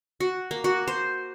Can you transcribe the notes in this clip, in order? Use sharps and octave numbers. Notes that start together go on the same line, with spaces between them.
F#4
A#3
F#4
C5